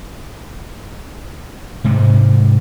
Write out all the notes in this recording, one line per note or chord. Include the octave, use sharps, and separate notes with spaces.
G#2 C3 G#3